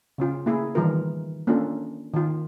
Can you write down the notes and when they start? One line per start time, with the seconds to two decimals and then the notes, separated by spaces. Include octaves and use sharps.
0.18 C#3 C#4 F4
0.46 A#3 E4 G#4
0.75 D#3 E3 G3 F4 A#4
1.47 A#3 C#4 D4 F4 A4
2.14 D#3 F4